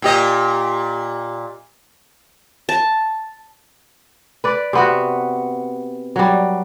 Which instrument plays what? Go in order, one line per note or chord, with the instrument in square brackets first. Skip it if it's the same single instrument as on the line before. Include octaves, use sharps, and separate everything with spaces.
[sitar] A#2 G4 D#5
[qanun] A5
[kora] B4 D5
C3 B3 F#4
F#3 G3